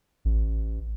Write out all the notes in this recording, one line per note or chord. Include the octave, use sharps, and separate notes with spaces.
A1